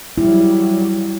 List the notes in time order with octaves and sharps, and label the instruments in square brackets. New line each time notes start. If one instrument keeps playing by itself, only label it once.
[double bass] F#3 G3 [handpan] E4